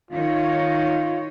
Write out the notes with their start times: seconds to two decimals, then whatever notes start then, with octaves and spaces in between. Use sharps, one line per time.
0.11 D#3 F4 C#5